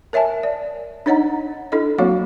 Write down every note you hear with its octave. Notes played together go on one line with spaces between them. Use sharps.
A#4 C#5 E5 G#5 A5
D5
D4 D#4 C#5 D#5 F#5 A#5
D4 E4 A4 D#5
F#3 A#3 C4 F#4 C#5 F5